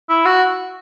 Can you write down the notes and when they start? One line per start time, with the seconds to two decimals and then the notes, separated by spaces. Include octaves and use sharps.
0.09 E4
0.25 F#4